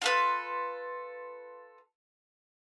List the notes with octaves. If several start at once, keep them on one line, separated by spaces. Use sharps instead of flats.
F4 A4 B4